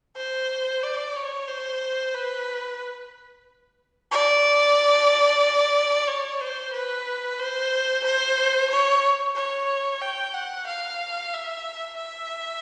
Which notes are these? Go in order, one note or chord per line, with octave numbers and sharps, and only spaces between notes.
C5
D5
C#5
C5
B4
D5
C#5
C5
B4
C5
C5
C#5
C#5
G5
F#5
F5
E5
E5